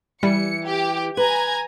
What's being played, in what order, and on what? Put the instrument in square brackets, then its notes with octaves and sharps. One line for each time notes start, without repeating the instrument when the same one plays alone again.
[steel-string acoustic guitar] E3 [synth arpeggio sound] G3 [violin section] C#7
[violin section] G4
[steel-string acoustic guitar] B4 [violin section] G#5 A#5 G#6